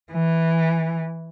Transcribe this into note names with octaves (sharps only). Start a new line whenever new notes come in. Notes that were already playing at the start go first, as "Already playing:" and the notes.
E3